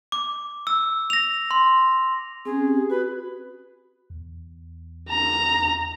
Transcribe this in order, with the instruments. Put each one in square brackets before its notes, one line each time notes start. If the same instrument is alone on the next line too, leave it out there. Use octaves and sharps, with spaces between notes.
[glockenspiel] D6
E6
A#6 F7
C6
[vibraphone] C4 C#4 [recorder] G#4
[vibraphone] G4
[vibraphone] F#4 [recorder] B4
[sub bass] E2
[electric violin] A#5